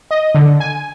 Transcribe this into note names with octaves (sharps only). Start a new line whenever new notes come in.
D#5
D3
G#5